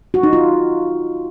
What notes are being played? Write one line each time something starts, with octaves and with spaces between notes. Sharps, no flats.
F#4
D#4
F4